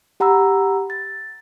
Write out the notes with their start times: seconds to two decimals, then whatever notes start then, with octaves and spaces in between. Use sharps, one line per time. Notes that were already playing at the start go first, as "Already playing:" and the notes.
0.20 G4 F#5 A#5 B5 E6
0.90 A6